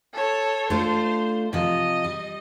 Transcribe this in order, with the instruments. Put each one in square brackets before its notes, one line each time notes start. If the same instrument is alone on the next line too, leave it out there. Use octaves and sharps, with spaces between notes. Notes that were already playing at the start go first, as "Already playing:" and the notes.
[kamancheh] A4 C#5
[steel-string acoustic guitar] A3 D4 F4 [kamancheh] C5
[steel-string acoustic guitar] C3 F3 [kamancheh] D#5
[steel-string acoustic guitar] G3